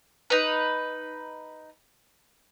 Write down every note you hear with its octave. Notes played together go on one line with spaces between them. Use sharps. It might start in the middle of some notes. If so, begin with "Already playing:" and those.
D#4 B4